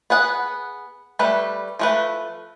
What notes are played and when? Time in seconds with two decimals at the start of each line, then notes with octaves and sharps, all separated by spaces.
0.10 B3 G#4 F#5
1.19 G3 A3 B4
1.79 F3 A3 B4